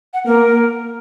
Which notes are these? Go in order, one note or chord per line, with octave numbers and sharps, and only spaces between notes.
F#5
A#3 A#4